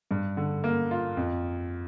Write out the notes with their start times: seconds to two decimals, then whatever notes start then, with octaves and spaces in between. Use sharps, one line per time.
0.11 G2
0.37 D3
0.64 A#3
0.91 F4
1.17 F2